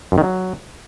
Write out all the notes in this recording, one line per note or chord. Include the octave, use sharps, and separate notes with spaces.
F#2
D#3
F#3